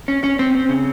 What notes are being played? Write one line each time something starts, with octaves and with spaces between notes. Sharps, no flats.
C#4
C#4
C4
C4
C#3